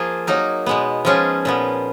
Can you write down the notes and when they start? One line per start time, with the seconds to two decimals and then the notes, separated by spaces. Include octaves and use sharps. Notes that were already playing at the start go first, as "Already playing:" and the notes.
Already playing: F3 A#3 F4 G#4
0.27 F#3 A#3 D#4 A#4
0.66 B2 G#3 B3
1.05 F3 G#3 C#4 F4 G#4
1.45 A#2 F3 B3